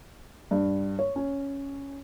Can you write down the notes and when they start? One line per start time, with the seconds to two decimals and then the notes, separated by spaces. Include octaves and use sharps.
0.51 G2
0.99 C#5
1.16 C#4